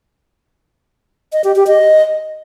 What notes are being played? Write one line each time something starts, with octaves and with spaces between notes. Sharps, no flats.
D#5
G4
G4
D#5